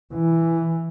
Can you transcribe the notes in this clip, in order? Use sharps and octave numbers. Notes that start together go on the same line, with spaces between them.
E3